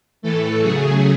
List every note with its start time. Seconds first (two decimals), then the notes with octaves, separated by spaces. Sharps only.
0.22 A2 E3 A3 A4
0.61 C#3 F#3 A3 G#4